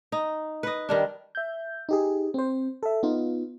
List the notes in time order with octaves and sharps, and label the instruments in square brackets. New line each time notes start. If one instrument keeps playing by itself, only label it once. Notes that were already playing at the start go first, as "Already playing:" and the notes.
[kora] D#4
B4 D#5
D#3 G3 D4
[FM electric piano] E5 G6
D#4 G4 G#4
C4 C5
A4 E5
B3 D#4 F4